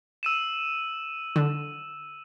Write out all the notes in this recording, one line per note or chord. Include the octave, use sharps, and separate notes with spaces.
E6 D#7 E7
D3